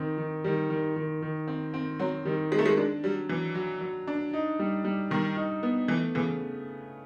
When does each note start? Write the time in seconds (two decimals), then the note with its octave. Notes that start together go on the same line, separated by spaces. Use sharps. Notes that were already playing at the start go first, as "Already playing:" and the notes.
Already playing: D#3 C4
0.18 D#3
0.44 D#3 G3
0.70 D#3
0.96 D#3
1.22 D#3
1.48 C4
1.74 C4
2.00 F#3 C4
2.25 D#3 G3
2.51 G#3 C4
2.59 A3
2.66 G#3
2.77 G#3 D4
3.04 F#3 G3
3.29 E3 F#3
3.55 F#3
3.81 F#3
4.07 D4
4.33 D#4
4.59 G3
4.84 G3
5.10 D#3 G3
5.37 D#4
5.63 B3
5.88 E3 A3
6.15 C#3 E3